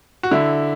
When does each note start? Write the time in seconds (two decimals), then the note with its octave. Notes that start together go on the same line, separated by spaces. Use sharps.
0.23 F#4
0.31 D3 E4